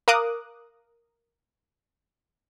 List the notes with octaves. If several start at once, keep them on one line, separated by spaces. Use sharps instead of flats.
A#4 F5 D6 D#6 F#6